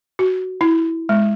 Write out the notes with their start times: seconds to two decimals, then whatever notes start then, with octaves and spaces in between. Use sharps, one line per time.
0.19 F#4
0.61 E4
1.09 G#3